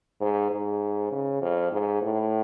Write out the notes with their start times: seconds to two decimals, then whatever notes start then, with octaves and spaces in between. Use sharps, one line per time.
0.21 G#2
0.51 G#2
1.11 C#3
1.42 F2
1.72 G#2
2.02 A2